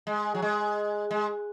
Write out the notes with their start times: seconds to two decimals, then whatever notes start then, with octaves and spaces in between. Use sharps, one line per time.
0.07 G#3
0.35 F#3
0.42 G#3
1.11 G#3